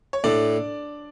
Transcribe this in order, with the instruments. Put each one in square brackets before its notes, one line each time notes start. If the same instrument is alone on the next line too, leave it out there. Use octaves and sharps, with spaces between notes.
[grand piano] C#5
[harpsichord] A2 [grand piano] D4 D5